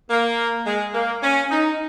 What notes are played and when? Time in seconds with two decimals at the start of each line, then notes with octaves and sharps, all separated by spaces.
0.11 A#3
0.67 G#3
0.94 A#3
1.23 C#4
1.51 D#4